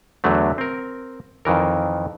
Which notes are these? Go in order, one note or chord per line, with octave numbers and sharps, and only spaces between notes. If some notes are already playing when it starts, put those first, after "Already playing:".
E2 D3 F#3 A3
C4 A#4
F2 D#3 E3 A#4